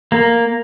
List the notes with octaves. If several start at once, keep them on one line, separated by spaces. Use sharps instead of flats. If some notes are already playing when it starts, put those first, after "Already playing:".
A#3